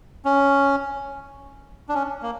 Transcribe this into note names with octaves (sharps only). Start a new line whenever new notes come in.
C#4
D4
C#4
A#3